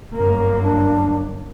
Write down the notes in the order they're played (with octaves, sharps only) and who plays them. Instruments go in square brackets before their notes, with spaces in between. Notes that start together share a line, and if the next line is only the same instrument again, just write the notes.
[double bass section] G1 F#2 A#3 [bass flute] A#4
[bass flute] D4